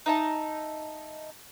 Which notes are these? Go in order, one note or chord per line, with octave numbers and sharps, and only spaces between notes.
D#4 E5 A5